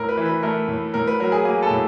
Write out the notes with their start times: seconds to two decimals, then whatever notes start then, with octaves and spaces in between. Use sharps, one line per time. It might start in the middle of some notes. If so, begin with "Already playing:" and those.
Already playing: A2 A#4
0.09 B4
0.17 E3
0.26 B4
0.43 A3 A#4
0.68 A2
0.94 A2 A#4
1.07 B4
1.20 F#3 A#4
1.32 G#4
1.45 A#3 G#4
1.63 A4
1.70 A2